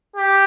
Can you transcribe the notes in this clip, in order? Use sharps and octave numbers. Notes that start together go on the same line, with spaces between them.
G4